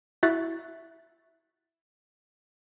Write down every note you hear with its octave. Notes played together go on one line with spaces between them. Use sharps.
E4 F#4 E5 F#6 A6